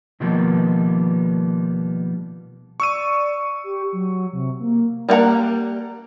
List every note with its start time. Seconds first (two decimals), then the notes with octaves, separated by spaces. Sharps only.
0.20 B2 D#3 F3 G3 A#3 B3
2.80 D5 C#6 E6 D#7
3.64 G4
3.93 F#3
4.33 C3
4.60 A#3
5.09 G3 A#3 E4 F#5 A#5